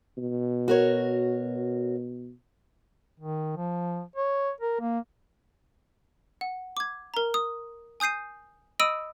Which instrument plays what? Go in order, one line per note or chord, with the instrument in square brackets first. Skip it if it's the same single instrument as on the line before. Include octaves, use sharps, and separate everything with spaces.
[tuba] B2
[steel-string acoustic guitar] F#4 A#4 C#5
[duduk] D#3
F3
C#5
A#4
A#3
[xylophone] F#5
D6 G#6
A#4 A#5
D#6
G#5 D#6 G6 C7 D#7
D#5 B5 D#6 E6 D7 D#7